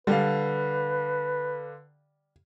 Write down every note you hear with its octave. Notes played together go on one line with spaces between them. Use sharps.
D3 G3 B4 F5